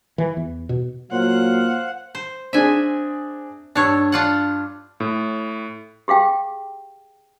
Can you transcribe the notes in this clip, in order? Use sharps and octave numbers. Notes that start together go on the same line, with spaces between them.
E3
E2
B2
A#2 F#3 C5 F5 F#5
C5
C4 D4 G#4 E5 G#5
G2 D4 C#5 E6
D4 F4 F#5
A2
G4 G#4 F5 G5